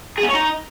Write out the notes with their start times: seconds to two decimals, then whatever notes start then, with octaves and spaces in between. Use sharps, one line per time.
0.18 G#4
0.23 B3
0.29 C#5
0.34 D#4